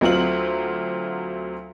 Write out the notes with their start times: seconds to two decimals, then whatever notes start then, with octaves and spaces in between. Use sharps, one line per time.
0.01 D2 F#3 C4 F4 F#7